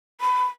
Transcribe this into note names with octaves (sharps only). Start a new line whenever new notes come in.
B5